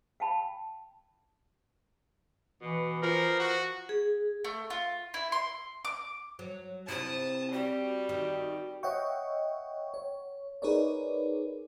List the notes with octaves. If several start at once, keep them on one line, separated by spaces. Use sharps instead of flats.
F5 G5 A5 B5
B2 E3
F3 A#4
F#4
G#4
A3
F4
E4
C6
D6
F#3
C3 E4 A5 D#6
G3 F#4
D#3
C#5 D#5 E5 F#5 G5 C#6
C#5
D#4 G#4 A#4 B4 C#5 D5